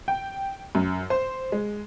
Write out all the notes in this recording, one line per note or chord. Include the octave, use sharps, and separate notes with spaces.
G5
F#2
C5
G#3